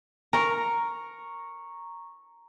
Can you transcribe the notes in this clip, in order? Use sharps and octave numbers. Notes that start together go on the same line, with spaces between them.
A#4 A#5 C#6